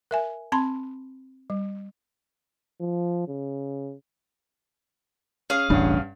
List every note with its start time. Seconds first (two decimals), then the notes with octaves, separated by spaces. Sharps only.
0.11 A#4 E5 G#5
0.52 C4 A5 B5 C6
1.50 G3
2.80 F3
3.28 C#3
5.50 C#4 G#4 F5
5.70 E1 A1 G2 C#4 D4 F#5